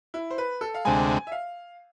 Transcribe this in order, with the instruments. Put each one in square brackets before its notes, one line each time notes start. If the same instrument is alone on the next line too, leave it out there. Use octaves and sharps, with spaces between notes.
[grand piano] E4
C5
B4
A4
F5
[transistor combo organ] D2 C3 G#3 [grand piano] G#5
[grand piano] E5
F5